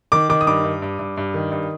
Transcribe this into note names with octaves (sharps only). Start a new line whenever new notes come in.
D#3 D6
D#3 D6
D#6
G2 D6
G2
G2
G2
G2
D#3
G2